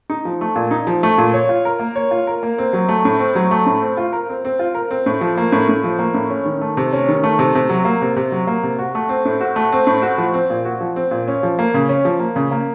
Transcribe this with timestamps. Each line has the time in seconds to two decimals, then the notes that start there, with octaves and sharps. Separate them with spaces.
0.10 D#4
0.25 F3
0.41 A3
0.56 A#2
0.71 D#4
0.87 F3
1.03 A3
1.18 A#2
1.34 C#5
1.49 F4
1.65 A#4
1.80 A#3
1.96 C#5
2.11 F4
2.27 A#4
2.43 A#3
2.58 C4
2.73 F#3
2.89 A3
3.05 A2
3.19 C4
3.35 F#3
3.51 A3
3.66 A2
3.82 C4
3.97 F4
4.13 A#4
4.29 C4
4.45 C4
4.59 F4
4.75 A#4
4.91 C4
5.06 A2
5.21 F3
5.38 A#3
5.52 A2
5.69 A2
5.84 F3
5.99 A#3
6.14 A2
6.30 C#4
6.46 D#3
6.61 A3
6.77 C3
6.93 C#4
7.09 D#3
7.23 A3
7.39 C3
7.55 C3
7.69 F#3
7.85 A#3
8.02 C3
8.17 C3
8.32 F#3
8.47 A#3
8.63 C3
8.79 F#4
8.95 A3
9.09 C4
9.25 A2
9.41 F#4
9.56 A3
9.72 C4
9.87 A2
10.02 F#4
10.18 F3
10.34 C4
10.50 A#2
10.65 F#4
10.81 F3
10.96 C4
11.11 A#2
11.28 C#4
11.43 F3
11.59 A#3
11.74 C#3
11.89 C#4
12.05 F3
12.20 A#3
12.36 C#3
12.51 A#3